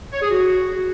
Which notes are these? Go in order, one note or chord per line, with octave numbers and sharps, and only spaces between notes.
C#5
G#4
F#4